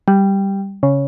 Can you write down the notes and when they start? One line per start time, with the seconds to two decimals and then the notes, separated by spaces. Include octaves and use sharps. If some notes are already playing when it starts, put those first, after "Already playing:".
0.08 G3
0.83 C#3